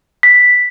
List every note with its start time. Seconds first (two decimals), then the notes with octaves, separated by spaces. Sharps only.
0.23 B6